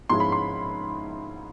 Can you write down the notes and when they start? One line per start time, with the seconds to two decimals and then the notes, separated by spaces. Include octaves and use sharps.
0.10 G#2 F3 G#3 C#4 E4 C6
0.20 B5
0.32 C6